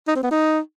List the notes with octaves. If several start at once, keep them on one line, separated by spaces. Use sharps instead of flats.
D#4
C4
B3
D#4